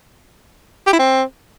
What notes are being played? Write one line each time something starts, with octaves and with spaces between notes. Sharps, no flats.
G4
E4
C4